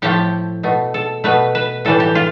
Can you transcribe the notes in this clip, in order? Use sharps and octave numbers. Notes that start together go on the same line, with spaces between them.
A2 F3 A3 G4
B2 A3
A4
B2 A3 B4
B4
A2 E3 G3 A4
G4
F4